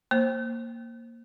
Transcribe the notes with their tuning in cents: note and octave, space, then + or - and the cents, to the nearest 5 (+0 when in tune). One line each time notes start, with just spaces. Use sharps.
A#3 +0 C5 +20